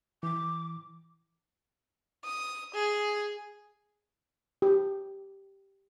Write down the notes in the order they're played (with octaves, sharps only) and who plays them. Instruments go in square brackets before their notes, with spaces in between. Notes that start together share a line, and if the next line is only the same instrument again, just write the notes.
[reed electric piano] E3 [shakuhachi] D6
[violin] D#6
G#4
[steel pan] G4